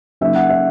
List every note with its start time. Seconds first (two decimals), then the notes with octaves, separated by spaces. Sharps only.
0.21 C#3 F#3 A#3 D#4 E5
0.35 F#5
0.50 E5